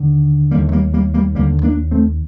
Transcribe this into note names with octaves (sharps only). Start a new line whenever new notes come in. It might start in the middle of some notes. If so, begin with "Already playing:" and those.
Already playing: D#2 D3
D#2 D3 G3 A#3
A3
G3 A#3
G3 A#3
G3 A#3
D#2 D3 G3 A#3
A#3 D4
A3 C4